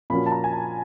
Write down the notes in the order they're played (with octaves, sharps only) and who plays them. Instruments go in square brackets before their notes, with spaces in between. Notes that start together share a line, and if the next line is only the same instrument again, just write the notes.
[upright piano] A#2 F3 A#3 C#4 F#4 [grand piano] B5
[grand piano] A5
A#5
G#5
A5